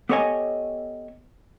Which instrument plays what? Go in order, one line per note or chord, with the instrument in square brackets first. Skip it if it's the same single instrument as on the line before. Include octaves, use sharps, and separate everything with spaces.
[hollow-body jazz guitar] B3 G4 A4 C#5 D#5 G#5